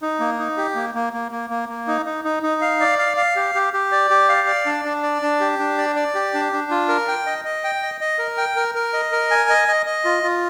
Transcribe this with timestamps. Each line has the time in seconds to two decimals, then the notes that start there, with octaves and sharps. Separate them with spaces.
0.02 D#4
0.20 A#3
0.39 D#4
0.57 G4
0.75 A#3
0.95 A#3
1.13 A#3
1.32 A#3
1.50 A#3
1.69 A#3
1.87 D#4
2.06 D#4
2.25 D#4
2.43 D#4
2.61 F5
2.80 D5
2.99 F5
3.17 F5
3.36 G4
3.55 G4
3.73 G4
3.92 D5
4.10 G4
4.29 F5
4.48 D5
4.66 D4
4.85 D4
5.03 D5
5.22 D4
5.40 G4
5.59 D4
5.78 D5
5.96 D5
6.15 G4
6.34 D4
6.52 D4
6.71 F4
6.89 A#4
7.08 G5
7.26 D#5
7.45 D#5
7.64 G5
7.83 D#5
8.01 D#5
8.19 A#4
8.38 G5
8.56 A#4
8.75 A#4
8.93 D#5
9.12 A#4
9.31 G#5
9.49 D#5
9.68 D#5
9.86 D#5
10.05 F4
10.23 F4